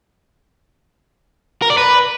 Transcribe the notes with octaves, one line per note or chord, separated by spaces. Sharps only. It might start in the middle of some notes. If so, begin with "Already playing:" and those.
A#4
D5
B4